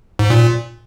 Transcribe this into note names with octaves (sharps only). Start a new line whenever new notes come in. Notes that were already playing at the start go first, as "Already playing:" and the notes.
G#2
A#2